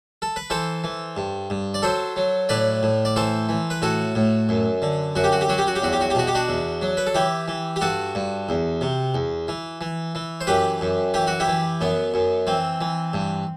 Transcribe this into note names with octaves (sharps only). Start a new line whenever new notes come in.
A4
B4
E3 A4 C5
E3
G2
G2
D5
F#3 A4 C5
F#3
A2 B4 D5
A2
D5
E3 A4 C5
E3
B4
A2 F#4 A4
A2
F#2
D3
F#2 F#4
G4
F#4
G4
F#3 F#4
G4
F#4
G4
E2 F#4
G4
F#4
G4
B2 F#4
G4
D4 F#4
E2
F#3
B4
A4
E3 E4 G4
E3
G4
G2 F#4 A4
G2
E2
C3
E2
E3
E3
E3
C5
F#2 G4 B4
F#2
E3 G4
F#4
E4 G4
E3
F#2 B3
F#2
E3 C4
E3
G2